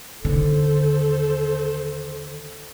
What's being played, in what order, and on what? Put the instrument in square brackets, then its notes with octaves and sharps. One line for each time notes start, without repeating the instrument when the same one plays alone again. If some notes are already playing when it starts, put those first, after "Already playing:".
[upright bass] D#2 D3 [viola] A4 C5